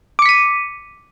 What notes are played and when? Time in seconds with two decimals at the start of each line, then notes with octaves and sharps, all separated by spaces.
0.19 D6
0.22 C#7
0.26 B6
0.29 D#7